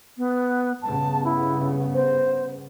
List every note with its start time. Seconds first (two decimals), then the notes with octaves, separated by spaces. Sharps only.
0.17 B3
0.82 G2 C#3 B3 A5
1.24 E4
1.94 C5